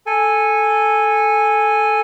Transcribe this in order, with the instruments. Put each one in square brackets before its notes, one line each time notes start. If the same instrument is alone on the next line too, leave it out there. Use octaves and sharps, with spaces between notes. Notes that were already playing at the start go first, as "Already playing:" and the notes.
[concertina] A4 G#5